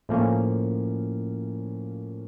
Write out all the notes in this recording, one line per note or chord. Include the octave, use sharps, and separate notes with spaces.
A2 F3 A#3 C#4